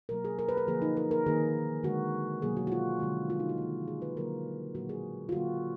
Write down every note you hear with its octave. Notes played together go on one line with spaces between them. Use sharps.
B2 F#3 A#3 A#4
G#4
A#4
B4
A#4
D3 F3 A#3 G#4
D#4
A#4
A#4
D#3 A#3 G#4
D3 G#3 F#4
B2 F#3 A#3 G#4
F#4
F#4
F4
D3 F3 G#3
F4
D#4
F#4
D#3 A#3
G#4
B4
D3 F#3 A#3 A#4
A#2 F#3 A#3 F#4
G#4
F4
D3 F#3 A#3 F#4